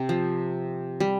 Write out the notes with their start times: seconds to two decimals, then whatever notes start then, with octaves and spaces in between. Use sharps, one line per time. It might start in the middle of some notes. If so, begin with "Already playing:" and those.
Already playing: C3
0.09 F3
1.00 G3